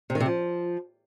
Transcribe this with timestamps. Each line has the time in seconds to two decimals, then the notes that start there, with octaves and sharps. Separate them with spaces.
0.10 C3
0.15 D#3
0.20 C3
0.26 F3